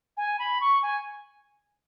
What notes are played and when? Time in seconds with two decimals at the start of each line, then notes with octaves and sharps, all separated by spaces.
0.17 G#5
0.39 B5
0.61 C#6
0.82 G#5